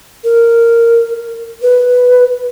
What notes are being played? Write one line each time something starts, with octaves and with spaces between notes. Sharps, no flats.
A#4
B4